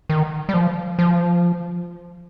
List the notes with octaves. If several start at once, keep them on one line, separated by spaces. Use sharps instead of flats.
D#3
G3
F3
F3